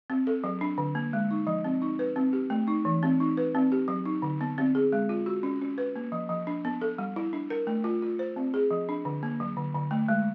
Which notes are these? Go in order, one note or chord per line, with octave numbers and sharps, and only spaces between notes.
C4
A4
F#3
D4
D3
A#3
G#3
D#4
F3
C4
D#4
B4
C4
G4
A3
D#4
E3
C4
D#4
B4
C4
G4
F#3
D#4
D3
B3
C4
G#4
G#3
F4
F#4
C#4
C#4
B4
A#3
F3
F3
D4
B3
A4
G3
E4
D4
A#4
A3
F4
F4
C5
C4
G#4
F3
D4
D3
A#3
F#3
D3
D3
A3
G#3